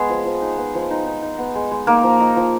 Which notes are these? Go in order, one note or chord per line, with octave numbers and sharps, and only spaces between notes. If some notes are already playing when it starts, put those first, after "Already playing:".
Already playing: G#3 B3 G#4
F3
F3
D#4
B3
F3
D#4
D#4
D#4
B3
G#3
G#3
A#3 D#4 A#4
F3
D#4
F3